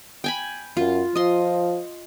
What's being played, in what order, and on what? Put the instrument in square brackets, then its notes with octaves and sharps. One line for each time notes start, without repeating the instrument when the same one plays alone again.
[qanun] G5 G#5 B5
[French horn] F#2 [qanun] F4
[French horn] F3 [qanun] D#5 C6